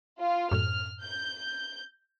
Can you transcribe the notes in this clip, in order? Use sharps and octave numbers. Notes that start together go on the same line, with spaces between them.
F4
F#2 A2 F6
G6